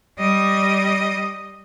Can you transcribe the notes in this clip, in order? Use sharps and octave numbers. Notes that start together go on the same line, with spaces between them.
G3 D#5